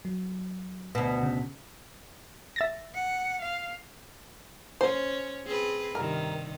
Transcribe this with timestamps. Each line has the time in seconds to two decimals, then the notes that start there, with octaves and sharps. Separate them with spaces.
0.05 F#3
0.95 D2 B2 B4
1.23 C#3
2.56 E5 A6 A#6
2.95 F#5
3.42 F5
4.81 C#4 C5
5.45 C4 G#4 B4
5.95 G2 C3 D#3 A#4